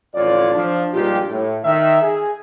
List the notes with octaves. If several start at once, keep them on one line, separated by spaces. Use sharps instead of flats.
A1 F2 D3 F4 C#5 D5
F3 D4
G2 A#2 G#3 D#4 F4 G4
A2
D#3 E5
G#4